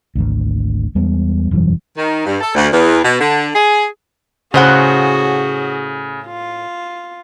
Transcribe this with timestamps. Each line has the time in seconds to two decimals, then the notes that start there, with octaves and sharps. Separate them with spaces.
0.15 G#1 D2
0.95 E2 G3 G#3 B3
1.51 E1 F#2 E3 G3
1.96 D#3
2.25 G2
2.41 A4
2.55 D2
2.71 E2
3.03 B2
3.20 D3
3.54 G#4
4.54 A2 C#3 F#4 G#4 C5 F#5
6.27 F4